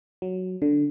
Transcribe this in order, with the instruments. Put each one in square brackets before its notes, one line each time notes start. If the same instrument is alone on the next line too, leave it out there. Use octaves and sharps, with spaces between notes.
[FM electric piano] F#3
D3